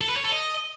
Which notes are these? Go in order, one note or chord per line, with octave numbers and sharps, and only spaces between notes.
A4
B4
C#5
A4
D#5